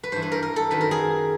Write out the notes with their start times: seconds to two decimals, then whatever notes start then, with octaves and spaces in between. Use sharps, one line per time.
0.03 B4
0.12 G2 E3 C5
0.22 B4
0.32 A#4
0.43 A#4
0.56 A4
0.71 F#2 D#3 F#3 B4
0.81 A#4
0.91 G#4